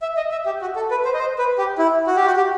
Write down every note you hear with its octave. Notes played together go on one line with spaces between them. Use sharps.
E5
D#5
E5
G4
F#4
A4
B4
C5
D#5
C5
B4
G4
E4
F#4
G4
F#4
G4